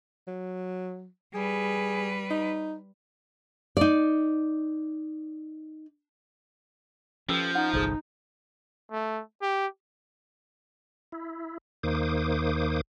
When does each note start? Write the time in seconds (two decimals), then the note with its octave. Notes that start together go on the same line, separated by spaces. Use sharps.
0.27 F#3
1.34 G3 G#4 B4
2.30 D#4
3.77 D#4 D5
7.29 F3 C#4 G4 A4 B4
7.55 D#4 F#5
7.73 G1 C2 G#4 A4 C5
8.92 A3
9.42 G4
11.12 E4
11.83 D#2 D#3 A#3 C5 D6 D#6